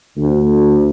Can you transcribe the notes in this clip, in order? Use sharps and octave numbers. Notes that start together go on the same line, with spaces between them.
D2